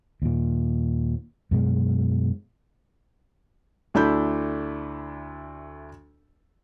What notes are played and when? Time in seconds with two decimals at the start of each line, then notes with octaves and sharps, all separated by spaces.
0.22 D#2 A#2
1.51 F#2 B2 G#3
3.94 D2 A3 D4 E4 B5 G6